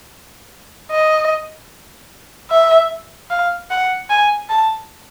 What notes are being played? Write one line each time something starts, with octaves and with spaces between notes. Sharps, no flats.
D#5
E5
F5
F#5
G#5
A5